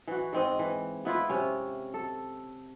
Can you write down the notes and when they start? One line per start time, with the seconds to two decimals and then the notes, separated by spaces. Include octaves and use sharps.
0.08 E3 F#4
0.33 G#2 C4 D#5
0.59 E3
1.05 B3 E4 F4 B4
1.29 C3 C#4
1.94 A4